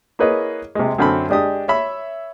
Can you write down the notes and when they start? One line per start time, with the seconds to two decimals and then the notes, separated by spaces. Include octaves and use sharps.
0.19 A#3 E4 G#4 B4 C#5 D#5
0.75 C3 G#3
0.99 F#2 D3 C4 A4 B5
1.30 G#3 D4 G4 D#6
1.68 C#5 E5 B5